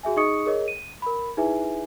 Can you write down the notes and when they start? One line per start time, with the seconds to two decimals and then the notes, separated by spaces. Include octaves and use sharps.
0.03 F#4 G#4 E5 G#5
0.16 D#4 G#4 D#5 C#6 D#6 C#7
0.46 G#4 A#4 C#5 D#5
0.68 D#7
1.02 A#4 B5
1.37 D#4 E4 G#4 B4 E5 G#5